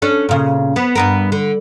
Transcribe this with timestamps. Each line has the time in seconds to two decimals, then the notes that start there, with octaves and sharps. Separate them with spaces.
0.02 C#4 D4 A4
0.29 A#2 C#3
0.76 B3
0.95 G2 B3 A#4
1.32 D3